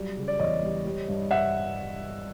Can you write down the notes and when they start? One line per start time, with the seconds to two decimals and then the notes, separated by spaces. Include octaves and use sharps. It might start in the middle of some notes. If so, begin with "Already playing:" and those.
Already playing: F#3 G3 D5
0.17 C#3
0.28 D5
0.39 E2 C#5 D#5
0.62 G3
0.85 G3
1.08 G2
1.31 G2 E5 F#5